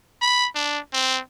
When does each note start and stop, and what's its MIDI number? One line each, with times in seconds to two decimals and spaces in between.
0.22 0.47 83
0.55 0.79 62
0.94 1.20 60